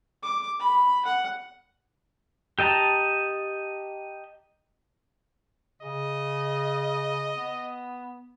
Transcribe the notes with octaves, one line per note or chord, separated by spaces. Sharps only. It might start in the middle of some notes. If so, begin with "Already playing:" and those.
D6
B5
F#5
G4 D#5 A5 A#5
C#3 D#5
B3